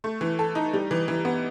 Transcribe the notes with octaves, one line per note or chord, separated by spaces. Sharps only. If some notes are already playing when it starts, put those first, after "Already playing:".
A3
E3
A4
D#4
G3
E3
E3
B3